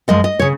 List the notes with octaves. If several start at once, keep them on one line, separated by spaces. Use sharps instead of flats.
F#2 F3 G#3 D#5
D#5
C#3 C#5